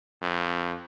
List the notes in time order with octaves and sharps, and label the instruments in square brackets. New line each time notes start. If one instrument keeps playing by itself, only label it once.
[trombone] F2